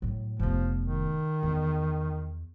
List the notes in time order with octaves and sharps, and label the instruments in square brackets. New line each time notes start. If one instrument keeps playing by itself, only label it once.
[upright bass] A2 F#3
[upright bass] F1 B3 [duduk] F3
[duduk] D#3
[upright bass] E2